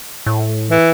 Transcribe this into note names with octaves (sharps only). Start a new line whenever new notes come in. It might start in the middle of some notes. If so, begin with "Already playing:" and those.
A2
E3